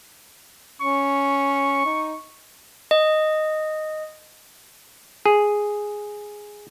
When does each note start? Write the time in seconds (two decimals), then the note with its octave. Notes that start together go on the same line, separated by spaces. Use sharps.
0.81 C#4 C#6
1.85 D#4
2.91 D#5
5.26 G#4